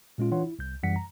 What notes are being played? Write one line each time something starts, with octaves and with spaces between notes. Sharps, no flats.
A#2 G#3 C#4 F4
E3 D4 F4 C#5 F#5 C6
E4
C2 G6
F#2 E3 G3 F#5 B6 C#7
A#5